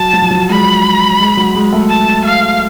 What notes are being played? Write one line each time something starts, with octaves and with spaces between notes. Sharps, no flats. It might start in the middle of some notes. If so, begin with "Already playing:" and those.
Already playing: F#3 A5
F#3
F3
F#3
G#3 B5
G#3
F#3
G#3
A3
A5
F5